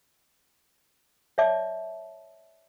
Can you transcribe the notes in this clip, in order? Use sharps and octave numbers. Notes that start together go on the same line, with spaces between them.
C#5 D5 E5 A5 D6